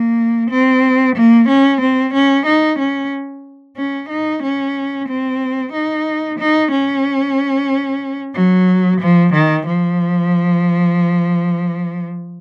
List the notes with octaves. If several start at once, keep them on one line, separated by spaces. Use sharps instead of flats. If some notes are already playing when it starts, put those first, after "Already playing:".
Already playing: A#3
C4
A#3
C#4
C4
C#4
D#4
C#4
C#4
D#4
C#4
C4
D#4
D#4
C#4
F#3
F3
D#3
F3